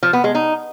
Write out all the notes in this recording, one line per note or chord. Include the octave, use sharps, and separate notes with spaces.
F3
B3
G#3
D#4